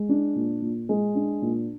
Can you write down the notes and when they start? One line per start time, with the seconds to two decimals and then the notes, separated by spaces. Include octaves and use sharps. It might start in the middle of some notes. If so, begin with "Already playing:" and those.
Already playing: G#3
0.09 D4
0.36 A#2
0.62 A#2
0.89 G#3
1.15 D4
1.42 A#2